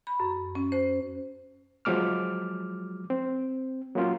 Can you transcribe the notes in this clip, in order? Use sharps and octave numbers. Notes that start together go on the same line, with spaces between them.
B5
F#2
C#4
C5
F3 F#3 G#3 D6 F6
C4
F#3 A#3 C#4 F4